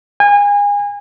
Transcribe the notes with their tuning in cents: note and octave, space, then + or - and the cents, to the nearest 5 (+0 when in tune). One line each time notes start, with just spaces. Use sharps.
G#5 -30